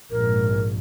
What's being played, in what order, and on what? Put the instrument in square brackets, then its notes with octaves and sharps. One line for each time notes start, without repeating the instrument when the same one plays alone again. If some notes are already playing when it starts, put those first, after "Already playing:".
[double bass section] A#1 G#2 [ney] A#4